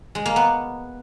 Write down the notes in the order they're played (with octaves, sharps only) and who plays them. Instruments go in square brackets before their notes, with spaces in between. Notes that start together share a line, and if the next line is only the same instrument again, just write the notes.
[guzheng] G#3
A#3
B3